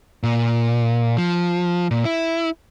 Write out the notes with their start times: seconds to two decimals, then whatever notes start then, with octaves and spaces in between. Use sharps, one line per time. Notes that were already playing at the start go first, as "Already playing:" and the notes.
0.23 A#2
1.17 F3
1.91 A#2
2.05 E4